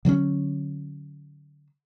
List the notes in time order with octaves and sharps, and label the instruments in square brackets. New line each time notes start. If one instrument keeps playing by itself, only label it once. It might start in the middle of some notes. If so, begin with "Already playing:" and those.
[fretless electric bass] D3 F#3 A#3 C#4